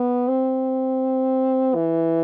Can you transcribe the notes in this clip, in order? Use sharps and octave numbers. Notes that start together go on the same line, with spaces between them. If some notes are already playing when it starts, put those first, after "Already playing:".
Already playing: B3
C4
E3